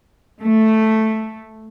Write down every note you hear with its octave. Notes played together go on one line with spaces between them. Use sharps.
A3